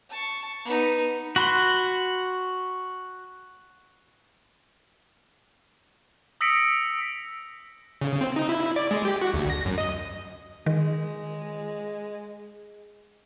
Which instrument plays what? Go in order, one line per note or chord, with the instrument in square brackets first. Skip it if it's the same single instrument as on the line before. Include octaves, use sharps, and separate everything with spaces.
[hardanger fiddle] A5 C#6
B3 D#4
[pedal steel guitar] F#4 B5 C6
[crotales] D#6 E6 A#6 B6 C#7 D7
[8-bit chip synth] C#3
C4
D#4
E4
D5
G#3
G4
F#4
D2
A#6
F#2
D#5
[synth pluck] D#3 [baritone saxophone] G#3